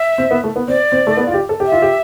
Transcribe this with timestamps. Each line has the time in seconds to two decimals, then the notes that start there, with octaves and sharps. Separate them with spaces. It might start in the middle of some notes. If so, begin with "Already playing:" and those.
Already playing: E5
0.18 C4
0.31 B3
0.44 A3
0.56 B3
0.68 C4 D5
0.92 C4
1.07 A3
1.17 B3
1.27 F4
1.34 G4
1.49 A4
1.60 G4
1.66 E5
1.72 F4
1.82 G4